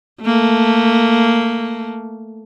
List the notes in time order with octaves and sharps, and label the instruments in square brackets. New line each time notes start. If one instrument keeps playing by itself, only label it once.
[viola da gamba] A3 A#3